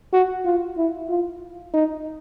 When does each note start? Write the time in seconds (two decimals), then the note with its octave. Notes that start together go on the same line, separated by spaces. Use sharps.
0.13 F#4
0.45 F4
0.78 E4
1.10 F4
1.74 D#4